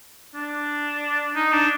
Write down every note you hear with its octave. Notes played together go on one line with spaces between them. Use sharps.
D4
D#4
D4